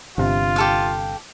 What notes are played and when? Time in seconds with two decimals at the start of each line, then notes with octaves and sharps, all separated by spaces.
0.18 G1 G2 C3 F4
0.56 G4 A4 F5